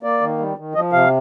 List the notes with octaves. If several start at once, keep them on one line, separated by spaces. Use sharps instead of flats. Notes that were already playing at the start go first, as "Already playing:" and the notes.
A#3 D5
D#3
G3
D#3
F3 D#5
C3 F5